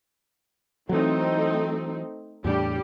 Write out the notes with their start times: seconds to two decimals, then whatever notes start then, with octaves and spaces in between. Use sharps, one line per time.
0.89 E3 F#3 A3 C4 D#4
2.44 E2 A2 G3 D4 G4